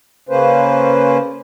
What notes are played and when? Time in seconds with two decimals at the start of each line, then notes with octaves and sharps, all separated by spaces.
0.29 C#3 A#3 C#4 B4 C5